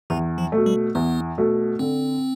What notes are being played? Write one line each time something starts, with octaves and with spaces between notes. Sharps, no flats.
E2 E3
F3
A3
B2
G3
E2 B3
B2 A3
D3 C4